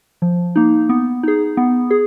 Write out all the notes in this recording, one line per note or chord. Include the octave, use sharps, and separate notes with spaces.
F3
A#3 D#4
B3
D#4 G#4
B3
G#4